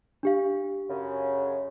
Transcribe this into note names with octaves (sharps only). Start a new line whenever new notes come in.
D4 G4 F5
F#2 C#3